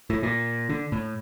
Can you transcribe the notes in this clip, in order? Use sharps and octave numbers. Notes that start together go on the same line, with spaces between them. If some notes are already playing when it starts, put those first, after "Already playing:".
A2
A#2
D3
A2